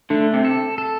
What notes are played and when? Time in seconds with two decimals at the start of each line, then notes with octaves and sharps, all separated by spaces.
0.10 D3 A3
0.34 C3
0.45 A4
0.78 A4